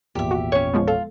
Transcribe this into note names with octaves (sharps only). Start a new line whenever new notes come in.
G#1 E2 A#2 G4 E5
F#4
C#4 C#5
F3 G#3 B3
F4 A4